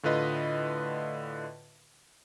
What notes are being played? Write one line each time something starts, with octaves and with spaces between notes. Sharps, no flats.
A2 D3 F4 B4 D#5